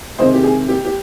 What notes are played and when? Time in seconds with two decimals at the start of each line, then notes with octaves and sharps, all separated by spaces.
0.18 C3 D#3 G#3 C5 D#5
0.34 G4
0.43 G#4
0.68 G4
0.85 G4